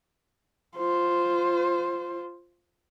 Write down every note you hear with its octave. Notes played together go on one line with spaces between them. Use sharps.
F4 C5